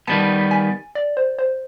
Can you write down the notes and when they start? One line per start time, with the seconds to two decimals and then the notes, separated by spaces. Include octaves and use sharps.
0.07 D#3 G3 B3 A5
0.51 G#5
0.95 D5
1.17 C5
1.39 C5